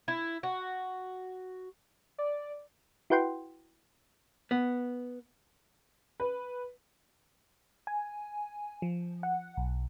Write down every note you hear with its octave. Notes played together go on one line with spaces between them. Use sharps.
E4
F#4
D5
E4 F#4 B4 F#5 G5 C6
B3
B4
G#5
F3
F#5
B1